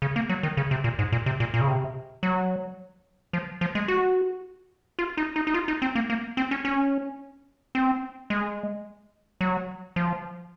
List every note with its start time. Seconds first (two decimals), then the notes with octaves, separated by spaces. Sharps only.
0.02 C#3
0.16 A#3
0.29 F#3
0.43 D#3
0.57 C#3
0.71 C3
0.84 A#2
0.99 G#2
1.12 A#2
1.26 C3
1.40 A#2
1.54 A#2
1.61 C#3
1.68 C3
2.23 F#3
3.33 F3
3.61 F3
3.75 G#3
3.88 F#4
4.99 F4
5.17 D#4
5.36 D#4
5.47 D#4
5.54 F4
5.68 D#4
5.82 C4
5.95 A#3
6.10 A#3
6.37 C4
6.51 C#4
6.65 C#4
7.75 C4
8.30 G#3
9.41 F#3
9.96 F3